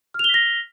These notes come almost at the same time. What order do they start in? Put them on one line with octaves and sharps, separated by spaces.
F6 F7 G7 B6 A#6